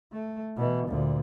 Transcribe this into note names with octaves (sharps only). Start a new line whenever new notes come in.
A3
B2 E3
D2 A#2